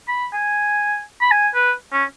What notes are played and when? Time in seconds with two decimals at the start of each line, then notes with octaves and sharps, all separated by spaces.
0.08 B5
0.33 G#5
1.21 B5
1.31 G#5
1.55 B4
1.93 C#4